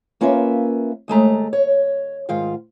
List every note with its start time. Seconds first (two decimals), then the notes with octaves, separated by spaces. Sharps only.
0.21 A#3 C#4 F4 B4 E5
1.08 D#2 G#3 A3 A#5
1.53 C#5
2.29 G#2 D#3 F4 F5